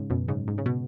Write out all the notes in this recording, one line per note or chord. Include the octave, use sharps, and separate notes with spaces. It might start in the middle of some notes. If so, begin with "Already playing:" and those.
Already playing: G#2 C#3
F#2 B2
G#2 C#3
G#2
C#3
B2